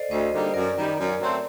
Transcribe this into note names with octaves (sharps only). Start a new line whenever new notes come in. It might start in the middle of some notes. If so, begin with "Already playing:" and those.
Already playing: A4 C5 D5 D#5
D2 C5 D#5
D3 G3 A#3 D#4
F#2 A#4 D5
D#3 G3
F#2
F#3 A3 C4